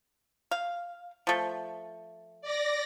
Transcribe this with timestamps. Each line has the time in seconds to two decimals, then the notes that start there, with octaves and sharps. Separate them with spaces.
0.51 F5
1.27 F3 A3
2.42 D5 A#6